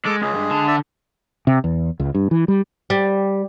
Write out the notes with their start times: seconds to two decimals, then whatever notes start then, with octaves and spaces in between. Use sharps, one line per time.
0.05 G#3 A4 A5 D6
0.21 C#2 G#3 G#4
0.35 G2
0.51 D3 A5
0.68 D5 E5
1.47 C3
1.64 E2
2.00 C#2
2.15 G2
2.31 E3
2.48 G3
2.90 G3